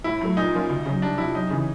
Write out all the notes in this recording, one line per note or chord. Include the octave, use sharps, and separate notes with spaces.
A2 E4
F#3 A3
A#2 D#4
F3 A#3 C#4 F4
D2
C#3 F#3
C2 D4
C3 F3 E4
F#2 D#4
C#3 E3